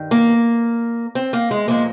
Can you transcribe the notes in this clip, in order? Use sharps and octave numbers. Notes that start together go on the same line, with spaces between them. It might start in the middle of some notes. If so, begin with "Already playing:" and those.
Already playing: G2 D#3
A#3
C4
A#3
G#3
A#2 F3 G#3 A#3